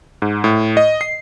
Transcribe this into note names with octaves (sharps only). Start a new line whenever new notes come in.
G#2
A2
D#5
C7